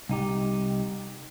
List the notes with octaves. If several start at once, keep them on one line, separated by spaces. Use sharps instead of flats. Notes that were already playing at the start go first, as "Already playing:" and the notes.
C2 D#4 G4